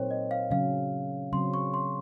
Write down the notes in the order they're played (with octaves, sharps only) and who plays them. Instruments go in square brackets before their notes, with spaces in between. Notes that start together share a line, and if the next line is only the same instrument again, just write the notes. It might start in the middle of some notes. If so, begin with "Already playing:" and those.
Already playing: [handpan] A#2 F#3 C4 D#4 [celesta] A#4 C5 C#5
[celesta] D#5
F5
[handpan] C#3 F#3 C#4 [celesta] F5
[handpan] C#3 F#3 C4 [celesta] C6
[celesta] C#6
C6